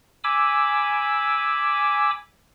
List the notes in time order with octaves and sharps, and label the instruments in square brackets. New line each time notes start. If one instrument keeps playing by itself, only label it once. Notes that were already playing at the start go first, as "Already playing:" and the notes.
[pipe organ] G#5 B5 D6 E6